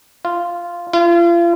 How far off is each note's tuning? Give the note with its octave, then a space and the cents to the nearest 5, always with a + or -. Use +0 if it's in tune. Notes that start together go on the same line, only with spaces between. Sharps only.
F4 -10
F4 -40